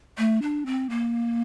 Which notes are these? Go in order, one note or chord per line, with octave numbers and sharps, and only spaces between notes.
A3
D4
C4
A#3